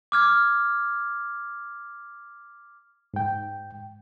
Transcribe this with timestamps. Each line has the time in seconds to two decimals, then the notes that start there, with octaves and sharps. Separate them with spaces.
0.12 D6 F6 G#6
3.14 G#2 G5